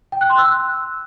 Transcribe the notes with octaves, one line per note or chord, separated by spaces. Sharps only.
G5
F#6
C6
E6
F#6